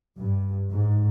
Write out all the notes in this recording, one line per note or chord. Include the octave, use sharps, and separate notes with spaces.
G2
G#2